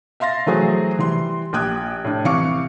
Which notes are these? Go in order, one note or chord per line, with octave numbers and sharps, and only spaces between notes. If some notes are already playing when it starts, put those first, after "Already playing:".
E5 F5 C6 A6 A#6
E3 F#3 A3 F#4 G#4 C5
E3 G3 C6
A#1 G4 G5 D#6 F#6 G#6
A2 D4
C2 E3 F5 C#6 D6 C#7